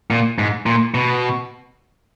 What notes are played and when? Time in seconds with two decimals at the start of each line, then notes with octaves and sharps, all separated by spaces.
0.11 A#2
0.39 G#2
0.66 A#2
0.94 B2